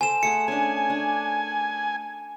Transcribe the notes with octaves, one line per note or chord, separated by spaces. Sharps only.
A4 C5 G#5 E7
A3 G#4 F#5 C#7
C#4 D4 G#5
D4